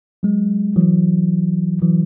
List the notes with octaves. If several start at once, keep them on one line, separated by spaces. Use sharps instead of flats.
F#3 G#3
E3 F#3
E3 F#3